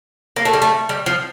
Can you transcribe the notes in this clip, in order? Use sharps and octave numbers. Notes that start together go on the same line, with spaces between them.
A#3
A3
G3
A3
G3
F3